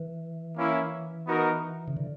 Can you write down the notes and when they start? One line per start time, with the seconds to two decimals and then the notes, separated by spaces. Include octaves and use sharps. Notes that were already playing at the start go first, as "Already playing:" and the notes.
Already playing: E3
0.57 A#3 C#4 E4
1.27 B3 D#4 F#4 A#4
1.88 C#3
1.97 D3